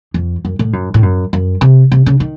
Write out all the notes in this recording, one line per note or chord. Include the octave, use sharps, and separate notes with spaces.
F2
F#2
A2
F#2
A2
F#2
F#2
C3
C3
C#3
D#3